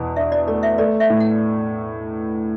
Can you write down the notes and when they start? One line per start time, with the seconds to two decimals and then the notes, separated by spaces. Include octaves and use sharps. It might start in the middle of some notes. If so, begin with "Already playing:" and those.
Already playing: E2 B2
0.16 D4 E5
0.32 D5
0.47 A3 D5
0.63 E5
0.78 A3 D5
1.00 E5
1.10 A2
1.20 F#5